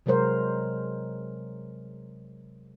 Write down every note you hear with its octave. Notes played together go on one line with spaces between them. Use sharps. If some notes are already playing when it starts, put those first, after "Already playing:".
C3 F#3 G#3 A#4 C5